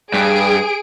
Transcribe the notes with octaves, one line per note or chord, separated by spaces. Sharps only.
G2 G#4 D7